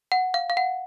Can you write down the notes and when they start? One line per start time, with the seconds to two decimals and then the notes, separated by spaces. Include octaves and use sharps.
0.12 F#5
0.34 F5
0.50 F5
0.57 F#5